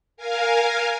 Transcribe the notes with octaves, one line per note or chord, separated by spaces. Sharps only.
A#4 F5 G#5